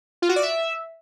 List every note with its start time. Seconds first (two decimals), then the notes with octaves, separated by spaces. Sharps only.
0.22 F4
0.29 F#4
0.36 D5
0.43 E5